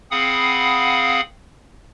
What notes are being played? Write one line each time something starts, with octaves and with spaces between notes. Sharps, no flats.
C4 G#4 F5 F#5 B5 D#6